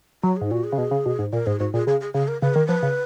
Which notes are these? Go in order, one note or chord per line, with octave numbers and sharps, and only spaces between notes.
F#3 F#4
G#2 G#4
A#2 F#4
G#4
C#3
B2
C#3
B2
G#2
A#2 A#4
G#2 G#4
G#2 F#4
A#2 G#4
C#3 G#4
G#4
C#3 G#4
A#4
C#3 B4
D#3 A#4
F3 B4
C#3